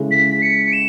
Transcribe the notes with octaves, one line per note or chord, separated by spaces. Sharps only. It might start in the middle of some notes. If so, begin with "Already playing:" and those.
Already playing: C#3 G#3 C#4 E4 A4
B6
C#7
E7